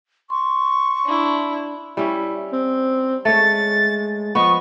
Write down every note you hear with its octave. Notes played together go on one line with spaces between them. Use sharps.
C6 C#6
D4 E4
G3 C#4 E4
C4
G#3 A3 C#5 A6
F3 B3 D#5 C#6